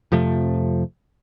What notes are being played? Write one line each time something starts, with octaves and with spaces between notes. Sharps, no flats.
F2 C3 F3 A3